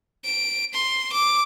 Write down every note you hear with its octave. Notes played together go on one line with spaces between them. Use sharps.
D7
C6
D6